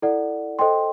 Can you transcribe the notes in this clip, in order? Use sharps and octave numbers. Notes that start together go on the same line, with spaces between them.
E4 A4 D5 F#5
A4 C5 D#5 G5 C6